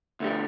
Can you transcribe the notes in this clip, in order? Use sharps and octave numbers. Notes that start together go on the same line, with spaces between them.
D2 D3 G3